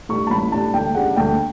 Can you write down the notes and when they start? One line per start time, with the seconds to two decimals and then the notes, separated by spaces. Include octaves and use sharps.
0.09 A2 G3 D4 C#6
0.27 A5
0.30 A1 B5
0.52 A2 G3 D4 A5
0.74 D2 G5
0.95 C#3 G3 D4 F#5
1.16 D2 G5